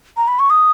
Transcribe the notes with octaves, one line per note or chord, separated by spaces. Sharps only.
A#5
B5
C#6
D#6